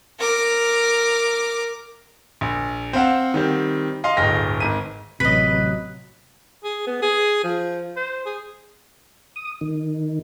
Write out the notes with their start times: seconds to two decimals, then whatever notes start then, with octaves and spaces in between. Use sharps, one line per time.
0.19 A#4 D6
2.41 A#1
2.93 C4 C5 F5 F#5
3.34 D#3 G3 C4
4.04 D#5 F5 C6
4.17 D1 G1 G#4 G5 F6 A#6
4.60 G#1 D#7
5.20 A1 C3 F#3 B4 D#5 B6
6.64 G#4
6.87 B3
7.02 G#4
7.44 F3
7.96 C5
8.25 G#4
9.36 D#6
9.61 D#3